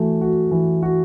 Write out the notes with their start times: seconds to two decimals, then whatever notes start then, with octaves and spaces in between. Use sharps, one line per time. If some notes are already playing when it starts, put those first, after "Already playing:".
Already playing: E3 A3 F#4
0.21 F#4
0.51 E3
0.83 F#4